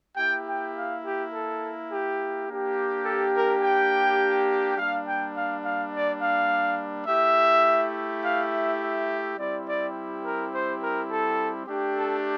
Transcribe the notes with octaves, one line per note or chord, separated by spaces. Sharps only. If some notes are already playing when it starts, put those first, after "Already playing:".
A#3 E4 G4 G5
G5
F5
G4
A4
G4
A#3 D4 G4
A4
A#4
G5
G3 A#3 D4 F5
G5
F5
F5
D5
F5
A3 E4 G4 E5
F5
E5
E5
G3 C4 E4 G4 D5
D5
A#4
C5
A#4
A4
A3 D4 G4
A4